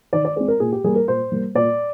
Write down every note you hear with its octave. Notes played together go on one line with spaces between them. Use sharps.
D#3 D5
D5
G#3 C4 D5
A#4
A#2 G#4
G4
G3 A#3 G#4
A#4
A#2 C5
G3 A#3
A#2 D5